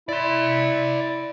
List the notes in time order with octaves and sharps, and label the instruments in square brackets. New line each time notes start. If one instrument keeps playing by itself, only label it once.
[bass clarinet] E4 [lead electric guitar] D5 C6